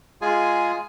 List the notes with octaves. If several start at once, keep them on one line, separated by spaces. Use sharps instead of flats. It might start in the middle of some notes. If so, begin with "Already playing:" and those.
G#3 F4 G#4 G#5